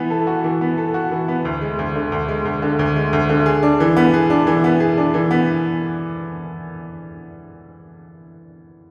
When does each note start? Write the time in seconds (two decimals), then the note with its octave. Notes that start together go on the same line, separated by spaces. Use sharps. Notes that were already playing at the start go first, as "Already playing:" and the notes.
Already playing: E3 B3
0.10 A4
0.27 F#4
0.44 E3
0.61 B3
0.77 A4
0.94 F#4
1.11 E3
1.28 B3
1.45 D2
1.61 G#3
1.79 D2
1.95 D3
2.12 D2
2.28 G#3
2.45 D2
2.62 D3
2.79 D2
2.96 G#3
3.13 D2
3.29 D3
3.46 G#4
3.63 D4
3.80 E3
3.97 B3
4.14 G#4
4.30 D4
4.47 E3
4.64 B3
4.80 G#4
4.97 D4
5.14 E3
5.31 B3